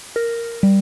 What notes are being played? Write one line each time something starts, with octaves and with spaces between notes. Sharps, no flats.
A#4
G3